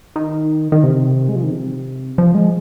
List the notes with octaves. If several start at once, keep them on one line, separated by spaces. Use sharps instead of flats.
D#3
D#3
C3
G#3
F3
D#3
C3
F3
G#3